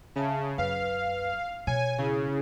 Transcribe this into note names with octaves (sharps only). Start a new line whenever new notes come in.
C#3 E5 A5
F#2 B4 F5
B2 C#5 G#5
C#3 E4 G#4